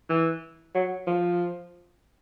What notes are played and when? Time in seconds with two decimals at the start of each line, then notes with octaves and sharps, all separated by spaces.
0.10 E3
0.75 F#3
1.07 F3